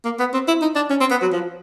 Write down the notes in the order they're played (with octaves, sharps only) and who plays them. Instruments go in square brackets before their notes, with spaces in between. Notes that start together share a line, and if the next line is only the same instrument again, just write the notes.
[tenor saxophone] A#3
B3
C4
E4
D#4
D4
C#4
C4
B3
F#3
F3